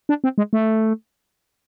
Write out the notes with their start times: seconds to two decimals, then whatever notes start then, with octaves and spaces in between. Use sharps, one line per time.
0.09 D4
0.24 C4
0.38 G#3
0.53 A3